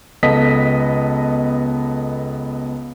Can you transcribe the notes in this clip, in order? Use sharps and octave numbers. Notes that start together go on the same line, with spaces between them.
C#2 B3 A4 D#5 B6